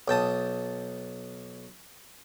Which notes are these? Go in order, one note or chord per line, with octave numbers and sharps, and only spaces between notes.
B1 G5 A5 D#6